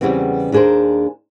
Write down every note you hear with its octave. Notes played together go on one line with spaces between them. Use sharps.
E2 G#2 C#3 G3 B3 C4
D#2 D4 G#4 A#4 C5